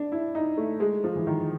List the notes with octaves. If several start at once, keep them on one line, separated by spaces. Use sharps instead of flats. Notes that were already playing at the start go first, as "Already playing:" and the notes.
Already playing: D4
E4
D#4
A3
G#3
F3
E3
D#3